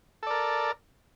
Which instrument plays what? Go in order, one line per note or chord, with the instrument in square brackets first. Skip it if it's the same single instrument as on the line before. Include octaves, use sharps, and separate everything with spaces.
[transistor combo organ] A4
D5
A#4